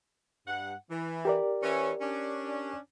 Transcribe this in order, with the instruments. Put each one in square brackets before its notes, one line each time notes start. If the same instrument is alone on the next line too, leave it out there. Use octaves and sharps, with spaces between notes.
[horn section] G2 F#5
E3
[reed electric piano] G4 A#4 D5
[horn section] E3 C#4 E5
C#4 D4